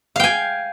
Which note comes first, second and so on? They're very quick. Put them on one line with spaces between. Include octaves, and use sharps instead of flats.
F5 G5 G#5